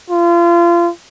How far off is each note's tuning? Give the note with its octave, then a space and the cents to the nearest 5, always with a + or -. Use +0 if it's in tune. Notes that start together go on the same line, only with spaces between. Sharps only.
F4 -30